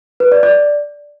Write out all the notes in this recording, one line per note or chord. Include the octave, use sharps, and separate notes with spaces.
B4
D5
D5